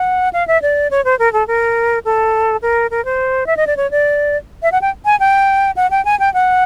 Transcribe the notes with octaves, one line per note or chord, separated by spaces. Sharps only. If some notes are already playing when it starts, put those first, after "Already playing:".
Already playing: F#5
F5
E5
D5
C#5
C5
A#4
A4
A#4
A4
A#4
A#4
C5
E5
D#5
D5
C#5
D5
E5
F#5
G5
G#5
G5
F#5
G5
G#5
G5
F#5